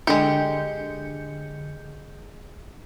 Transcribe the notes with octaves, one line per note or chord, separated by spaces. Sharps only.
D3 G#3 G4 G6 C#7